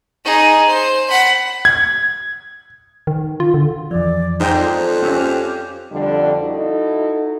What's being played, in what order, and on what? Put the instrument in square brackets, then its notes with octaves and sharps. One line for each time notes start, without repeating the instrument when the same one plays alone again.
[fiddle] D#4 G#4
C5
F#5 B5
[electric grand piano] G#6
[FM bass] D#3
F4
D3
[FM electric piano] F2 E3 F3 [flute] D5
[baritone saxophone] G#2 [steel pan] D#4 G5 A#5 [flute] C5
[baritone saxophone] F2 [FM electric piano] A4 D5
[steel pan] C4 C#4 [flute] G4
[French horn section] F2 D3 G3 D4
D#4 E4 F#4 A4